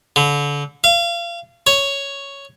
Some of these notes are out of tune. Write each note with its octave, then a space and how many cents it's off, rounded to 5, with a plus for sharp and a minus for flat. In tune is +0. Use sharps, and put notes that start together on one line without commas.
D3 -30
F5 -30
C#5 +0